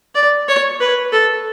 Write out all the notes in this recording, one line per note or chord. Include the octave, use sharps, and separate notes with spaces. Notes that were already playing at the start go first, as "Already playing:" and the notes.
D5
C#5
B4
A4